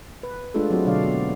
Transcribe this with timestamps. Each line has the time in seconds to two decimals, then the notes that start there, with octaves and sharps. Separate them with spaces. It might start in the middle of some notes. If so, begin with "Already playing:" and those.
0.23 B4
0.54 G#3 A3 D4 F4 A4
0.71 F#3 C4 F4 F#4
0.85 B2 D3 F#3 D4 D5 F5
1.03 B3